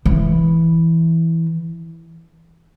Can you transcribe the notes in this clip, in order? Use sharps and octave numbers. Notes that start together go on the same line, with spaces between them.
E3